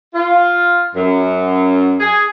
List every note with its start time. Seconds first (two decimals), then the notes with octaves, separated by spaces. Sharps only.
0.15 F4
0.95 F#2
2.00 G#4